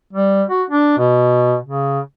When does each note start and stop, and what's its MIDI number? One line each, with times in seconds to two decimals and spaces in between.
0.13 0.43 55
0.50 0.63 66
0.70 0.96 62
0.98 1.57 47
1.65 2.00 49